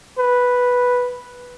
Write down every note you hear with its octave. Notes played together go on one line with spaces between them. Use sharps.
B4